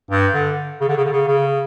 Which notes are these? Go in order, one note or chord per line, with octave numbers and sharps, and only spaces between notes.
G2
D3
C#3
D3
C#3
D3
C#3
C#3